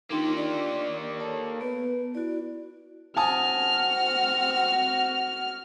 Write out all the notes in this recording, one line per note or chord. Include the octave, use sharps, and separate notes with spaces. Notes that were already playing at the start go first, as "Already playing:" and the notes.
A#3 D4 D#4 F4 G4 C6
D5
A4 C#5 A5
B3 B4
E4 F#4 D5
C4 F#4 G#5 A5 D#6 F6